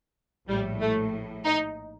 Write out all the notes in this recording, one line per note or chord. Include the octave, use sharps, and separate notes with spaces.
A#1 A2 G3
A3
D#4